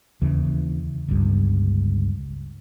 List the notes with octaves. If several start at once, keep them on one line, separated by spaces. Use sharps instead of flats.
D#2 C#3 E3
G1 C#2 G2